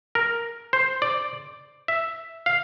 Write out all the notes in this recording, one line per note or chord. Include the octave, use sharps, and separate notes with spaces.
A#4
C5
D5
E5
F5